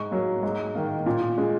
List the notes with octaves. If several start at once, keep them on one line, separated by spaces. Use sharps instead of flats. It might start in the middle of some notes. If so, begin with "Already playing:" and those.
Already playing: G#2 C#6
F#3 A#3
G#2
D#3 A#3
A#2
G#3